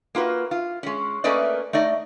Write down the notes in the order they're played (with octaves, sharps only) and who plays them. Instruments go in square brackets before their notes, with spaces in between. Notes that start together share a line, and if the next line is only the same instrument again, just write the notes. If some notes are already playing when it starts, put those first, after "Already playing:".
[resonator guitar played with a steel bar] A#3 F4 F#4 B4
F4
G#3 C#4
A3 A#3 C#4 B4 D5 D#5
A3 D#4 D5 D#5